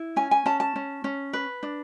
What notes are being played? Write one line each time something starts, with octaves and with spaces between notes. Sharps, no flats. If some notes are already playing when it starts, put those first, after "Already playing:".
Already playing: E4
C#4 G#5
G#5
C#4 A5
A5
C#4
C#4
B4
D4